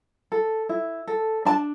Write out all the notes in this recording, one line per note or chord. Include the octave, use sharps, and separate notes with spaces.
A4
E4
A4
D4 A5